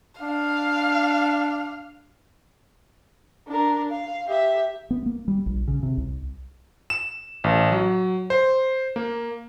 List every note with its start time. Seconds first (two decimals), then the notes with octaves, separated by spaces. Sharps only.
0.21 D4 F5
3.48 D4 A#4
3.91 F5
4.27 G4 E5
4.91 B3
5.06 A#3
5.28 G3
5.46 A#1
5.68 C#3
5.83 C3
5.98 C2
6.90 E7
7.44 A1
7.72 F#3
8.30 C5
8.96 A#3